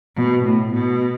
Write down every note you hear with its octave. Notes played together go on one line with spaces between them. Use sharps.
B2
A2
B2